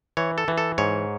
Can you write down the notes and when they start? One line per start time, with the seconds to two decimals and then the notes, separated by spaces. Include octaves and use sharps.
0.17 E3 C#5
0.38 A4
0.48 E3
0.58 A4
0.78 G#2 C#5